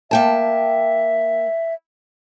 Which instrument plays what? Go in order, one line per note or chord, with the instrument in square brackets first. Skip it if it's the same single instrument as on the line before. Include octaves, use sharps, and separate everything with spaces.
[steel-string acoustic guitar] A#3 G5 A5 [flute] E5